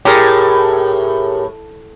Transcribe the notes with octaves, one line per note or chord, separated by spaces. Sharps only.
A2 G4 G#4 A#4